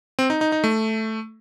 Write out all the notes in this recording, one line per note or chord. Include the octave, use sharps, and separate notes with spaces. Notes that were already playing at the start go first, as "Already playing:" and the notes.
C4
D#4
D#4
D#4
A3